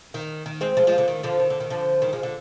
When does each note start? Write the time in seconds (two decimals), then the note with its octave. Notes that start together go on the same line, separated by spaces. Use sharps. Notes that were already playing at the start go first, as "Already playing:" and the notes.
0.14 D#3
0.46 D#3
0.61 G#3 C4
0.77 F3 G#3
0.87 F3 G#3
0.98 D3
1.08 D#3
1.23 D3 F3
1.40 D#3
1.50 D3
1.60 D#3
1.70 D3 F3
2.02 D#3 G3
2.13 F3 G#3
2.23 D3